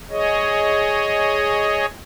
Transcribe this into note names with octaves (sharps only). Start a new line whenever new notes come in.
G#4 C#5 D#5